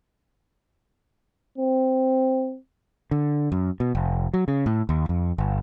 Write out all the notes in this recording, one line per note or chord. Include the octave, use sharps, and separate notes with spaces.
C4
D3
F#2
B2
F1
F#3
C#3
A2
D#2
F2
G1